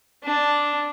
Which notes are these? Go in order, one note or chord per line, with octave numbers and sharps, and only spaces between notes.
D4